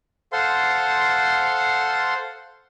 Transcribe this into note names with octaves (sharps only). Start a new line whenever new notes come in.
A4 C5 F5 F#5 C6